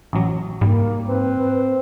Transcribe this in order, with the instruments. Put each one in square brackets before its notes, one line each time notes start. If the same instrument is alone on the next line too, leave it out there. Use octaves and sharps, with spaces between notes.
[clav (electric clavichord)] A1 F#3
[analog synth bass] G#2 [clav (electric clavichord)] G3 [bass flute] A#3
[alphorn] C4 [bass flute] B4